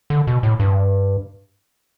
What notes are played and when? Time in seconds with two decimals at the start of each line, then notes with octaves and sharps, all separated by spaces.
0.10 D3
0.27 B2
0.43 A2
0.60 G2